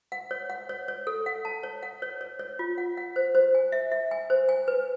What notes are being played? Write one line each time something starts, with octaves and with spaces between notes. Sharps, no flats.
F#5
C#5
F#5
C#5
C#5
A4
F#5
A5
C#5
F#5
C#5
C#5
C#5
F4
F#5
F#5
C5
C5
G#5
E5
E5
G#5
C5
G#5
B4